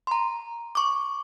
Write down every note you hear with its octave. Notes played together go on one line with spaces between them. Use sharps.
A#5 C6
C#6 D6